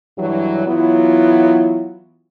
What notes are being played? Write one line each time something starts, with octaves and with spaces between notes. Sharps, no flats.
G2 E3 F#3
E3 F#3 B3 E4 F4